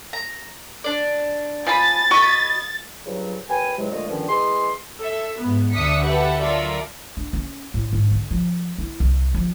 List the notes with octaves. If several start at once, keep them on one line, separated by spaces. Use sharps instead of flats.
A#5
D4 D5
F3 G#5 A5 B5 A6
F#4 D#5 B5 C#6
G2 C#3 F3 F#3
D#2 B4 G5 G#5
G#2 C3 E3 F#3 G#3
A#2 D3 F3 G#3 A3 D#5
G2 A#2 D3 D#3 F3 C#4
E3 G#3 G#4 C6
A4 E5
G#2 B3
D2 D4 E5 D#6 B6 C#7
G4 A4 B4 E5 F#5
F#3 F4 A4 A#4 D5 E5
D4
C#4
A2
G#2
D3
F3
E4
C2
F3